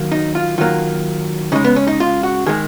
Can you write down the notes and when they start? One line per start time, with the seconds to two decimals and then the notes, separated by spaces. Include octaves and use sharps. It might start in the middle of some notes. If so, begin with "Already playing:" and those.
Already playing: D#3 F#3 A#3
0.12 D#4
0.35 F4
0.58 D#3 F#3 A#3 F4
1.52 C#3 G#3 D#4
1.64 B3
1.76 C#4
1.87 D#4
2.00 F4
2.23 F#4
2.46 D#3 G#3 G#4